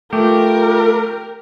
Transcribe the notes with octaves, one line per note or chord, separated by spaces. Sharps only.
A3 F4 G4 A#4